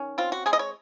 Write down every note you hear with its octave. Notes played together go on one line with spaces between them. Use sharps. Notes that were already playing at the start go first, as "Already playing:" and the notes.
Already playing: D#3 C#4
C4 F4
F#4
G#3 G#4
D#5
C#5